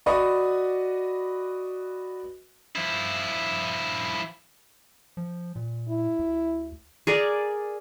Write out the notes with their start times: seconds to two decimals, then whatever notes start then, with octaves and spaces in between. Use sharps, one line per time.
0.06 F#4 B4 D5 D#5 B5 C#6
2.76 F3 E4
5.17 F3
5.56 A#2
5.89 E4
6.19 D2
7.07 G#4 A#4 D5